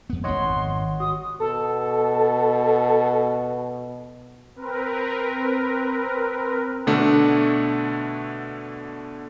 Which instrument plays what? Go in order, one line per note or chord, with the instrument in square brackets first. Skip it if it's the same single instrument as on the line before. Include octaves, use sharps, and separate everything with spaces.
[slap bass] F2 B3
[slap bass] G#1 G#2 D#3 [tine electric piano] C#5 D#5 F#5 [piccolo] C6
[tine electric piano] F#4 [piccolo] D#6
[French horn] B2 [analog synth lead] A4
[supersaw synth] C4 A#4 B4
[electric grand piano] B2 D3 A3 D4